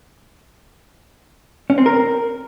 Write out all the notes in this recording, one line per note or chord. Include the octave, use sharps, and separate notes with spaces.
C#4
C4
A#4